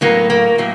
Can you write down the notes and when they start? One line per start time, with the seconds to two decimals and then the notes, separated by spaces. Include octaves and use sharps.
0.01 A2 F#3 A#3 B3
0.30 A#3
0.58 A2 F#3 A#3